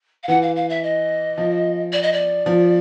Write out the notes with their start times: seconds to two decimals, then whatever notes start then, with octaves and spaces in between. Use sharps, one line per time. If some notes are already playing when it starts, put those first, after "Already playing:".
0.23 F5
0.28 E3 F#5
0.42 F5
0.56 F5
0.69 E5
0.83 D#5
1.38 F3
1.92 D5
2.02 D#5
2.13 D5
2.46 F3